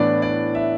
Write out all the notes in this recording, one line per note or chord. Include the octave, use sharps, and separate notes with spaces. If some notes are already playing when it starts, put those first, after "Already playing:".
Already playing: A2 E3 B3 D4 D5
D5
E5